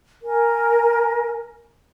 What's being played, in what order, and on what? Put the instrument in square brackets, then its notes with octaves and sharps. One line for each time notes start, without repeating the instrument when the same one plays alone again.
[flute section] A#4 G#5